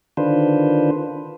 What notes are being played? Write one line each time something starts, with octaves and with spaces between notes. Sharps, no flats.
D3 D#3 D4 F4 B4 C5